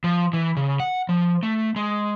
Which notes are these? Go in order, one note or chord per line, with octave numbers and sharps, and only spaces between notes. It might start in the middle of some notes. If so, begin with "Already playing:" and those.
F3
E3
C#3
F#5
F3
A3
G#3